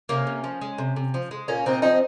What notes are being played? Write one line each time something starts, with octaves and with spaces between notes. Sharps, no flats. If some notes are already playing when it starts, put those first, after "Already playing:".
C3 A#3 C#4
C3
F3
G#3
C3
C3
F3
G#3
A#2 A#3 C#4
A#2 C4 D#4
F3 C4 D#4